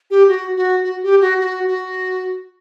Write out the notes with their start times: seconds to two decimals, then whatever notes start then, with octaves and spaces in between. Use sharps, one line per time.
0.11 G4
0.28 F#4
0.56 F#4
0.84 F#4
1.03 G4
1.21 F#4
1.40 F#4
1.68 F#4